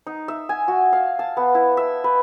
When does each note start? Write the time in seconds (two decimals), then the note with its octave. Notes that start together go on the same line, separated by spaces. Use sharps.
0.07 D#4
0.28 E5
0.49 G#5
0.68 F#4
0.93 F5
1.19 A5
1.37 B3
1.55 E4
1.77 E5
2.04 B4